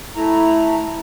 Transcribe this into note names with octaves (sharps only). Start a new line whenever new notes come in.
A3 E4 A#5